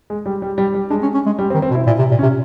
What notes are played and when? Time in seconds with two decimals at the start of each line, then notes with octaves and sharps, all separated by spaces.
0.10 G#3
0.26 G3
0.42 G3
0.58 G3
0.74 G3
0.90 G#3 D4
1.02 C#4
1.14 C#4
1.26 G#3
1.39 G3
1.50 C4
1.54 D#3
1.62 C4
1.71 B2
1.75 E4
1.87 A#2 E4
1.99 C3
2.11 A#2
2.19 C#4
2.23 C3